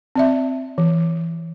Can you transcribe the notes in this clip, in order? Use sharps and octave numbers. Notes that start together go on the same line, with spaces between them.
C4 D5 E5
E3